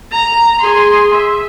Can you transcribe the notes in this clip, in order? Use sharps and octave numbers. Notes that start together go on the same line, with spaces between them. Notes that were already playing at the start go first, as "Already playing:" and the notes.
A#5
G#4 C6
E5